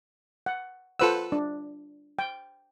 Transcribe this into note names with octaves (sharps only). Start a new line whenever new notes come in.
F#5
F4 A4 B4 C5 F#5 E6
D4
G5